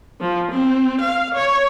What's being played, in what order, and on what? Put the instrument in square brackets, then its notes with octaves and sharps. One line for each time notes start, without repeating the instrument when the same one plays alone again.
[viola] F3
C4
F5
C#5